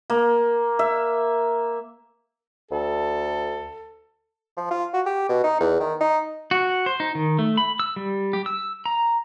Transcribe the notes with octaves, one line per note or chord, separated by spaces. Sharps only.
A#3
E5
D2 A4
F3
F4
F#4
G4
B2
D#4
E2
D#3
D#4
F#4
C5
D#4
D#3
A3
B5
E6
G3
G4
E6
A#5